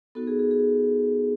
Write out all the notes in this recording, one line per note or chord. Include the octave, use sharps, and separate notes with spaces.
B3 D#4 F#4 A4
G#4
G#4
G#4